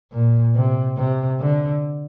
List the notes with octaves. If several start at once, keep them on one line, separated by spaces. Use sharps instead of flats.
A#2
C3
C3
D3